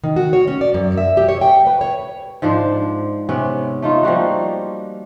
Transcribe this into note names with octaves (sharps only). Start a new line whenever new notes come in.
D#3
F#4
C#5
C#4
D5
F#2
E5
G4
C#5
G5
B4
C#5
G#2 F3 D4 C5
C3 B3 C#4
A3 D#4 F4
F3 G3 A#3 F#4